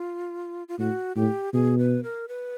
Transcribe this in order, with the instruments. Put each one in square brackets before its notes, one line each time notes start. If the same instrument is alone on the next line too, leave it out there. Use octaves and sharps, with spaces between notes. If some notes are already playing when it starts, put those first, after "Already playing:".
Already playing: [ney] F4
F4
[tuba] A2 [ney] F#4
[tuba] A2 [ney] G4
[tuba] B2 [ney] G#4
[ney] B4
A#4
B4